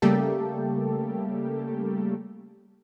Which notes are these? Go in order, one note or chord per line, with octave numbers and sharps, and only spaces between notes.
C#3 G3 A3 A#3 G4 A4